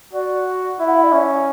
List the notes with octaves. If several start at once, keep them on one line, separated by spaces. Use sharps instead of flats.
F#4 D5
E4 E5
F#5
E5
D5
C#4 E5